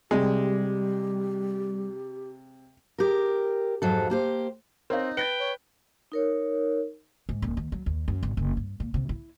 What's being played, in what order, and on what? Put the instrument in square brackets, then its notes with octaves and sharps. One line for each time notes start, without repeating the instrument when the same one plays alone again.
[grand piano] C3 [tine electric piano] G3 [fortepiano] G#3 [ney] G4
[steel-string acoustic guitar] G4 A#4
F2 G#2 F#3 A4
A#3 G4 C5
[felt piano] C4 [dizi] D#4 [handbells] A#4 C#5 F5
[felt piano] B4 [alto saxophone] G5 [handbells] A6 A#6 C#7
[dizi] C#5
[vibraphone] D#4 A#4 C#5
[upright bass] G#2
D#1
D#2
F#3
D#2
F#2
G#1
F#1
G2
A#2
C3
E4